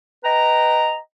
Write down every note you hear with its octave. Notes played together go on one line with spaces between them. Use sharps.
B4 D#5 G5 A#5